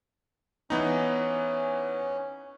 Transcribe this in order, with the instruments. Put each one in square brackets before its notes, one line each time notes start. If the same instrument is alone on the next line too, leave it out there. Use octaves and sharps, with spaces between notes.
[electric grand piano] E3 B3 D#4 [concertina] C#4